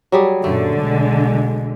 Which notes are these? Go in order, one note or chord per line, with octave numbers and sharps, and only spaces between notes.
F#3 G3 G#4
F#2 A#2 D3 A3
B1 G#3